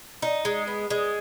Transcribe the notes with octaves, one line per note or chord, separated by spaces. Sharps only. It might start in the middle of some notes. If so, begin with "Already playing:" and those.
D#4
G#3
B3
G#3